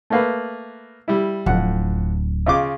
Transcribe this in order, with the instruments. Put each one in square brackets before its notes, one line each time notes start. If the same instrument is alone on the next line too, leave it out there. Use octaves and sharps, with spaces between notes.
[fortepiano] A3 A#3 B4
G3 E4
[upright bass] D1 [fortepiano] F2 F#5
[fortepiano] C#3 F4 D6